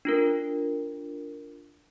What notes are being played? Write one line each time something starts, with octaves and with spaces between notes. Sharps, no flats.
D4 F4 A#4